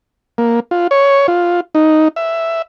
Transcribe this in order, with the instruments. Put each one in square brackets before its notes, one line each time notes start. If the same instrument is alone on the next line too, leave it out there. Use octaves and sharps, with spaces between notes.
[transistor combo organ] A#3
F4
C#5
F4
D#4
E5